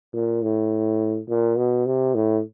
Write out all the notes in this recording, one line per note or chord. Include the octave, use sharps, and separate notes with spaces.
A#2
A2
A#2
B2
C3
A2